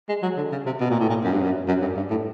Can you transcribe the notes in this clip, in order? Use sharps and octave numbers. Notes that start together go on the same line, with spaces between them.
G#3
F#3
D3
C#3
C3
B2
A#2
A2
A#2
F#2
G2
F#2
F#2
G2
G2
A2